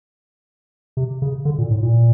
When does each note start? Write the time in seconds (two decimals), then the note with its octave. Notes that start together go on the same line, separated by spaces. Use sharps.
0.97 C3
1.22 C#3
1.45 D3
1.58 A#2
1.71 A2
1.83 A#2